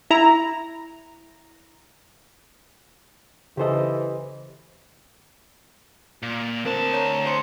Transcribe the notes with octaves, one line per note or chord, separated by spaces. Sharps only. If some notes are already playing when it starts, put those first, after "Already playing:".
E4 A#5
C#3 E3 G4 A4 C5 D#5
A#2
D2 C4 A#4 C5 A5
C#5 A#5
C5 C6 C#7